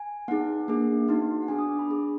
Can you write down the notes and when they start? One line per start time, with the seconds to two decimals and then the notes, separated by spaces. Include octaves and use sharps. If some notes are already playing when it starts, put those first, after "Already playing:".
Already playing: G#5
0.28 B3 D#4 G#4 F#5
0.68 A#3 D4 G#4
1.08 B3 D#4 F#4
1.42 F#5
1.48 B3 D4 G#4 G#5
1.59 D#6
1.69 D6
1.79 B5
1.89 D4 G#4